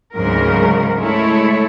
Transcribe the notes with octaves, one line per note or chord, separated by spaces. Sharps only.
D2 G#2 C#3 F#3 A#4
G#3 A3 E4 A4 C#5